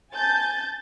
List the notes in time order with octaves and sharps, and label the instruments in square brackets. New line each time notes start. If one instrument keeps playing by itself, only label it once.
[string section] G#5 A5 G6 A6